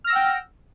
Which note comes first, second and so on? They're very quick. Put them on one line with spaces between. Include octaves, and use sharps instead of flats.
F6 A#6 E6 F#5 G5